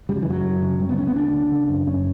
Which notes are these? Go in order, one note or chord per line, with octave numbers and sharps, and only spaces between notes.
C#3 G3
F#3
E3
F#2 F#3
F#2
C#3
C#3 G3
B3
D2 C#4
B3
D2 D4
C#3
C#3
F#2
F#2 C#4